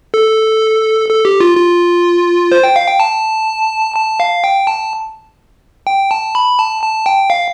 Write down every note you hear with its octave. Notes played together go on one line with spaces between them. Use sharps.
A4
A4
G4
F4
F4
C5
G5
F5
G5
A5
A5
F5
G5
A5
G5
A5
B5
A5
A5
G5
F5